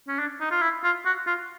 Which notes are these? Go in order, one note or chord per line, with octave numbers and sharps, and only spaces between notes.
C#4
D4
D#4
F4
E4
F4
F#4
F4